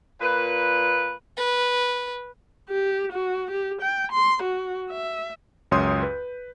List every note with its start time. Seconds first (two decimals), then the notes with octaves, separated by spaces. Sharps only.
0.21 A#2 B4
1.37 B4
2.69 G4
3.12 F#4
3.51 G4
3.81 G5
4.12 C6
4.43 F#4
4.91 E5
5.71 C#2 F#2 C#5 C6 D#6 G6
6.03 B4